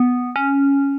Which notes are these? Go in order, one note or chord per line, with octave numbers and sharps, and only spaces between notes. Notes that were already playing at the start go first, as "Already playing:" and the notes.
Already playing: B3
C#4